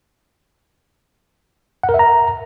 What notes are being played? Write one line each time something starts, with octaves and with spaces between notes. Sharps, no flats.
F#5
A#4
E5
A#5